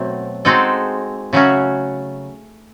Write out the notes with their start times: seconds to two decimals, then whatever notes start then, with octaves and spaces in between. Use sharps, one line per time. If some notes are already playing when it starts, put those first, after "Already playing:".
Already playing: B2 F#3 A3 C4
0.45 G#3 C4 D#4 F#4 A4
1.33 C#3 F#3 A3 C#4 F#4